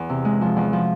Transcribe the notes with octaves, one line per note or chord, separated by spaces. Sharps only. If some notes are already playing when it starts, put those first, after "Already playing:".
Already playing: E2
C3
G#3
F3
E2
F3